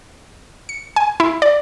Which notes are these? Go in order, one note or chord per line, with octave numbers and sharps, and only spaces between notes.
C#7
G#5
E4
D5